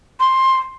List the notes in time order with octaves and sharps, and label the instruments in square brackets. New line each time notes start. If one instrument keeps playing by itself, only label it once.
[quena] C6